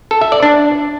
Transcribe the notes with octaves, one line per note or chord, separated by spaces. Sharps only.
A4
E5
D5
D4